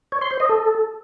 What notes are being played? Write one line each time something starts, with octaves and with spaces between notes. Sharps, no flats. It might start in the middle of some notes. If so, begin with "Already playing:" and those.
C#5
C6
C5
D#5
A4